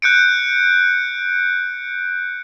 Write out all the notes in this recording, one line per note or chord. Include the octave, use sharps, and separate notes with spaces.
F#6 G6 C#7 D7